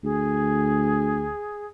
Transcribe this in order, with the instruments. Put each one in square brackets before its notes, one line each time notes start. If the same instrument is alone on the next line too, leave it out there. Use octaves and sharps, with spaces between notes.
[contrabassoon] D2 [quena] G#4